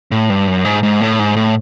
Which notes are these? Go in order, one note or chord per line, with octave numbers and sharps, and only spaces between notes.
A2
G2
F#2
G#2
G#2
A2
G#2
A2